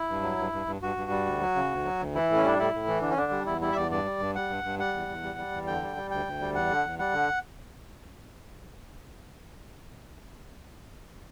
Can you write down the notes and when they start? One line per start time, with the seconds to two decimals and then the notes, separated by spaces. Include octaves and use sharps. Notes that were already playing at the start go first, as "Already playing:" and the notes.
Already playing: E4
0.09 G2
0.22 F#3
0.38 G2
0.53 G2
0.67 G2
0.82 G2 F#4
0.96 G2
1.11 G3
1.26 D2
1.41 F#3
1.55 C#3
1.71 D2
1.84 F#3
1.99 D2
2.15 E3 E4
2.30 A2
2.36 C#4
2.43 G3 D4
2.59 A2 E4
2.74 A2
2.87 E3
3.02 D3 D4
3.11 C#4
3.17 D3 D4
3.32 G3
3.46 E2 E4
3.61 G3 E4
3.72 E5
3.76 E2 D5
3.90 G2 D5
4.05 G3
4.20 G2
4.35 G3 F#5
4.50 G2
4.64 G2
4.79 G3 F#5
4.94 E2
5.08 E2
5.23 G3
5.38 G3
5.52 E2
5.67 D3 G5
5.82 G3
5.97 G3
6.11 D2 G5
6.26 D2
6.41 G3
6.55 E2 F#5
6.71 D3
6.85 E2
6.99 G3 F#5
7.14 D3